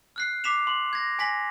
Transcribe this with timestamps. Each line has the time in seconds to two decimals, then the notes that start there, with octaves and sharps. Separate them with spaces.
0.16 F6 F#6 C7
0.44 D6 B6 C7 E7 F7
0.67 C6
0.93 G#6 A#6
1.19 G#5 A#6 B6 F#7